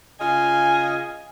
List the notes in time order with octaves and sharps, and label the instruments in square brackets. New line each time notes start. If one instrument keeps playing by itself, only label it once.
[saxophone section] C#3 F4 D#5 [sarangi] G#5